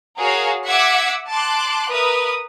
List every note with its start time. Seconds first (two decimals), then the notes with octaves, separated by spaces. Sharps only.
0.18 F#4 G#4 A#4 C#5 F5
0.67 E5 F#5 D6 E6 G#6 B6
1.31 A5 C6 D6 F#6
1.90 A#4 B4 E5 D#6